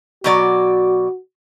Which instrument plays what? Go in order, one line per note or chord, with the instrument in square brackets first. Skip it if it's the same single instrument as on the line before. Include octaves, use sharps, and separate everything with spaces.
[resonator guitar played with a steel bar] B2 F#3 D5 [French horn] F#4